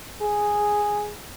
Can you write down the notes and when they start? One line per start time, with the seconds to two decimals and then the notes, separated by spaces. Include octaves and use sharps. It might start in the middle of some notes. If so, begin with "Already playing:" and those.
0.21 G#4